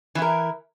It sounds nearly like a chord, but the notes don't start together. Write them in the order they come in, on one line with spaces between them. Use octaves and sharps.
E3 E4 A#4